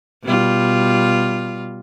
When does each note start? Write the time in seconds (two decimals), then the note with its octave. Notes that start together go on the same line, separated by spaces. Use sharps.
0.23 B2 G3 F4